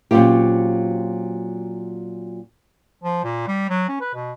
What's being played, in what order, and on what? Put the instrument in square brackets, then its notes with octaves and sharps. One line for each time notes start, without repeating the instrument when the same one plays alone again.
[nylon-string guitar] A#2 F#3 C4 C#4 F4 G4
[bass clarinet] F3
A#2
G3
F#3
C#4
B4
B2